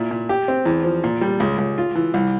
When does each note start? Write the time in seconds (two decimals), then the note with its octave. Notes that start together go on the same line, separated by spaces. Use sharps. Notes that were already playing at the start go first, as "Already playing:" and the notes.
Already playing: A#2 E4
0.11 A#2
0.29 G4
0.48 C4
0.66 E2
0.84 F3
1.04 A#2
1.21 G3
1.40 C#2
1.58 C#2
1.78 F4
1.95 E3
2.14 C2